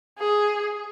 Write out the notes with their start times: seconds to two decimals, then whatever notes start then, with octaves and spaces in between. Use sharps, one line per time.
0.19 G#4